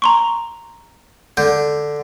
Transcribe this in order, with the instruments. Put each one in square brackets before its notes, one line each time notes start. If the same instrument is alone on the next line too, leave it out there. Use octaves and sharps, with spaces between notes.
[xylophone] A#5 C6 C#6
[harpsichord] D3 [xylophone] G6